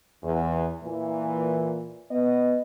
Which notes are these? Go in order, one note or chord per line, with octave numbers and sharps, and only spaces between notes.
E2
A#2 E3
B3 D#5